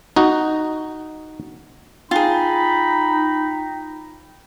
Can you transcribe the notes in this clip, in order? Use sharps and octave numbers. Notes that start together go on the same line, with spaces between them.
D#4 F#4
D#4 F4 G#4 G5 B5